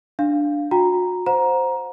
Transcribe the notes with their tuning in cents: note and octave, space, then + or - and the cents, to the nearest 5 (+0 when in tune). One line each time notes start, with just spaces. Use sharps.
D4 +0 F5 +0
F#4 -35 G5 +0 A#5 +0
C5 +0 F#5 -40 A#5 +15